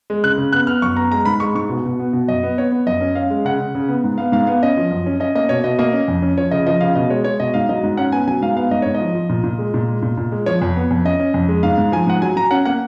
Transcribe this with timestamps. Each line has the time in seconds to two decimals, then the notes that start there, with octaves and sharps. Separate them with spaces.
0.10 G#3
0.23 C#3 F#6
0.38 C#3
0.53 B3 F#6
0.67 B3 F6
0.82 F#2 C#6
0.96 B3 A#5
1.12 G#3 A#5
1.25 G#2 B5
1.40 G#3 C#6
1.55 G#2 C#6
1.69 B2
1.85 B2
1.99 B3
2.13 B2
2.28 F#2 D#5
2.43 B3
2.58 B3 C#5
2.72 B3
2.87 F#2 D#5
3.01 C#4
3.15 C#4 F5
3.30 G#3
3.45 C#3 F#5
3.60 C#3
3.75 C#3
3.88 B3
4.04 G#2
4.18 B3 F5
4.32 G#2 F5
4.47 B3 F5
4.62 C#4 D#5
4.77 F3
4.91 F#2
5.06 C#4
5.20 C#4 D#5
5.35 A#3 D#5
5.49 B2 C#5
5.64 B2 D#5
5.79 A#3 D#5
5.93 C#4
6.08 F2
6.22 C#4
6.38 F3 C#5
6.51 C#3 D#5
6.66 F3 D#5
6.81 C#3 F5
6.95 B2 D#5
7.10 G#3 C#5
7.24 G#3 C#5
7.40 B2 D#5
7.54 G#2 F5
7.69 F#3 D#5
7.84 G#2
7.97 C#4 F#5
8.12 B3 G#5
8.27 F#3 G#5
8.41 G#2 F5
8.57 B3 F5
8.71 G#2 D#5
8.82 G#2 C#5
8.94 D#5
9.00 F3
9.15 F3
9.29 A#2
9.44 A#2
9.58 G#3
9.74 A#2
9.88 G#3
10.02 A#2
10.17 A#2
10.32 G#3
10.46 F3 C#5
10.62 F2
10.76 B3
10.91 F2
11.04 C#4 D#5
11.19 C#4
11.34 F2
11.48 G#3
11.63 G#2 F5
11.78 G#2
11.92 F3 G#5
12.07 G#2 F#5
12.22 F#3 G#5
12.36 F#3 A#5
12.51 C#4 F#5
12.65 A#3 F#5